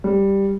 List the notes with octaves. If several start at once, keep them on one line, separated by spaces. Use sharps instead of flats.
G3